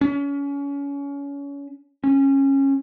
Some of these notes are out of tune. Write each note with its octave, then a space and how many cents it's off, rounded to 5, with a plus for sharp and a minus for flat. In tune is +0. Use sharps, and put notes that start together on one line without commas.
C#4 +30
C#4 -20